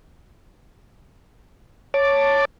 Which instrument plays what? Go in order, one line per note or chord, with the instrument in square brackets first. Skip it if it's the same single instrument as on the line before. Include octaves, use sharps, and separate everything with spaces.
[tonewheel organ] C#5 A5 D6